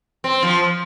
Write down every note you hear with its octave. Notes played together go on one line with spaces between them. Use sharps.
C4
F3